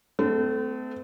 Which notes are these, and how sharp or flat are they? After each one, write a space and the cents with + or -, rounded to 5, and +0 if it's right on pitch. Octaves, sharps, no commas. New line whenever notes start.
A3 +0 C4 -40